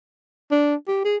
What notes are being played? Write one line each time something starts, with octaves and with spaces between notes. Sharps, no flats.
D4
G4
G#4